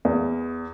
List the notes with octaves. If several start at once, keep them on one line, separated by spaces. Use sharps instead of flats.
E2